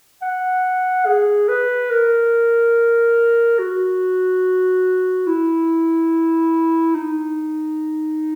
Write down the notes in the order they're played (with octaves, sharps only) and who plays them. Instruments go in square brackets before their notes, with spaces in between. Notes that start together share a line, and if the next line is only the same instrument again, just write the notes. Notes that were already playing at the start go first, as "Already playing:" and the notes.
[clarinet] F#5
G#4
B4
A#4
F#4
E4
D#4